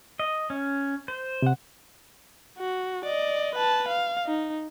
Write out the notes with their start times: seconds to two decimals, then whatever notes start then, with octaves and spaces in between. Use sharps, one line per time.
0.19 D#5
0.50 C#4
1.08 C5
1.42 C3 F#5
2.59 F#4
3.05 D5 D#5
3.55 B4 A5
3.88 F5
4.26 D#4